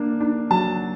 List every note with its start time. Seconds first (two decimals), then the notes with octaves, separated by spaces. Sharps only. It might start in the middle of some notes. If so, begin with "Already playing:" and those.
Already playing: A#3 D4
0.20 D4
0.50 F#3 A5